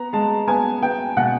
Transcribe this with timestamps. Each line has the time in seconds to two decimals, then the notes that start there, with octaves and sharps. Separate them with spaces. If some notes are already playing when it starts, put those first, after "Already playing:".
Already playing: B3 A#5
0.13 G#3 A5
0.48 B3 G#5
0.82 B3 G5
1.17 B2 F#5